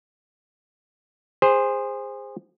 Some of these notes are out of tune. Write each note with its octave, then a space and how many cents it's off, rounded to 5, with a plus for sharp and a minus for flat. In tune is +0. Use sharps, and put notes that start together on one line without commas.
G#4 -25 C5 +0